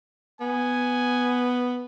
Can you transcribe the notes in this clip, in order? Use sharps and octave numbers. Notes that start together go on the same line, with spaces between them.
B3 G#5